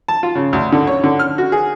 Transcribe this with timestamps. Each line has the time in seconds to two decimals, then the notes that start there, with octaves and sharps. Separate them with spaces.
0.08 A5
0.23 F4
0.35 C#3
0.53 D2
0.72 D3
0.87 C#5
1.04 D3
1.19 F6
1.38 F#4
1.52 G#4